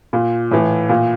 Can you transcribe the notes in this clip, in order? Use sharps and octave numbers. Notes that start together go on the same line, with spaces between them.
A#2
A2 E3
A#2